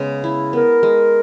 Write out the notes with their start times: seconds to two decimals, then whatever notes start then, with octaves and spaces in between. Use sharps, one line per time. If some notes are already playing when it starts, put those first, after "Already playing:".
Already playing: C#3 G#3 B3
0.24 E4
0.53 B3 A#4
0.83 G#3